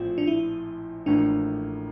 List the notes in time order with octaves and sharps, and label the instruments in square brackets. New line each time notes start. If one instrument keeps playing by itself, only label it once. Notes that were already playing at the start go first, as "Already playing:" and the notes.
Already playing: [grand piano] A#1 A2 F3 C4 [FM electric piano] F4
[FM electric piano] D4
E4
[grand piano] A1 A2 F3 A#3 [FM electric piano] D4